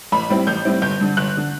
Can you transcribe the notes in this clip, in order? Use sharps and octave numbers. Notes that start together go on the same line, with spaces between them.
A1 B5
A2 G3 C4 E4
A1 G6
A2 G3 C4 E4
G1 G6
G2 D3
G1 F#6
D3